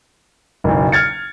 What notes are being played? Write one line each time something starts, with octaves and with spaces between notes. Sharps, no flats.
F#1 B1
F6 G#6 A6 C#7